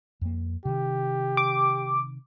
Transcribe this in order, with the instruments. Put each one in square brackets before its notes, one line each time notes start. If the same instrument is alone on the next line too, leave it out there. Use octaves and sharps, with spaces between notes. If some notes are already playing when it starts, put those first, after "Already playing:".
[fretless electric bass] F2 A#3
[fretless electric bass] C3 D#3 [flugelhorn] G4
[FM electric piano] D6